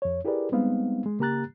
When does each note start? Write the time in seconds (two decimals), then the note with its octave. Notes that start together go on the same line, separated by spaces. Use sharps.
0.02 F2 C#5
0.25 E4 G4 G#4 A#4 B4 D5
0.52 G3 G#3 B3 C4 D#4 F5
1.06 G#3
1.19 C#3 A#3 G4 A#5 F#6 A6